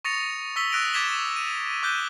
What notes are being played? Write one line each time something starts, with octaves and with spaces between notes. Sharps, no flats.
C#6 D#6 A6 A#6 C#7 F7
C#6 E6 B6 G7
D#6 E6 F#6 A#6 D7 F7
D6 G#6 A6 B6 E7 G7
D#7
D6 F#6 G6 G7